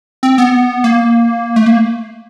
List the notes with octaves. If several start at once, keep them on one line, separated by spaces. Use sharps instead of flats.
C4
B3
A#3
A3
A#3